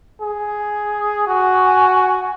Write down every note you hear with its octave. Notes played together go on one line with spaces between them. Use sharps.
G#4
F#4 G#5